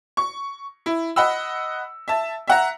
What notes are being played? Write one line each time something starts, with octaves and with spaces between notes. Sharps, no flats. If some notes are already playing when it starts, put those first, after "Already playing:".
C#6
E4
D#5 F#5 B5 E6
E5 A5
E5 F#5 A#5